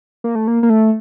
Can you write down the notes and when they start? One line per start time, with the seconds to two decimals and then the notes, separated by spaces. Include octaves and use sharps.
0.24 A#3
0.35 A3
0.48 A#3
0.63 A#3
0.70 A3